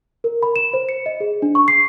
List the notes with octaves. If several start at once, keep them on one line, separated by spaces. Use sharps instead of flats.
A#4
B5
E7
C5
C#7
D#5
G#4
D4
C#6
C7